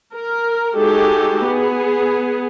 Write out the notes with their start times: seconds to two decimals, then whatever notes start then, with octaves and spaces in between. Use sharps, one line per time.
0.14 A#4
0.75 G#3 D#4 F#4 G4 A4
1.45 B3 G#4